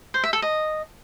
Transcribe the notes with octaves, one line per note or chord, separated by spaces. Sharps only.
C5
E5
A4
D#5